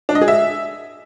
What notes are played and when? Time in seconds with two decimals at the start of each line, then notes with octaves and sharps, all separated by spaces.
0.09 D4
0.15 D#5
0.21 G#4
0.28 E5